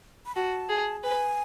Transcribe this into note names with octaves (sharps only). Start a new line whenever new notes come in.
B5
F#4 A5
G#4
B4 G#5